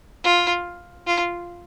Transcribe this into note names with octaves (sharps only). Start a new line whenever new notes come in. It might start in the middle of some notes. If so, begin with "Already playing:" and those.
F4
F4